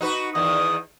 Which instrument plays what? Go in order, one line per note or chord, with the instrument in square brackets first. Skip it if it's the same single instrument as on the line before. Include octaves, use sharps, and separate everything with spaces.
[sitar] D#4 F#4 B4
[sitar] E2 D#3 [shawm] D#6